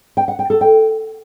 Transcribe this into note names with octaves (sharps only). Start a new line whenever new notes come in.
G5
F#5
G5
A4
G5